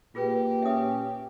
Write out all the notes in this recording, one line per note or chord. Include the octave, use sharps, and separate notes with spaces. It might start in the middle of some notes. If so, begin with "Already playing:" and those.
A#2 F4 G4 G#4 B4
C#4 E5 D#6